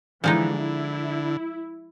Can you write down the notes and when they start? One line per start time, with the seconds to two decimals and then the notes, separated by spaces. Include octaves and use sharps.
0.24 D3 E3 F3 G#3 D#4
0.57 E4